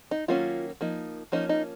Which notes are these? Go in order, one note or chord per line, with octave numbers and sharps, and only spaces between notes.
D#4
D#3 F#3 A#3 C#4 F4
F3 A#3 D#4
F3 A#3 C#4 D#4
D#4